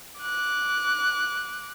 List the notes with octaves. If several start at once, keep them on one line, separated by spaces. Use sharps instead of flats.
D6 F#6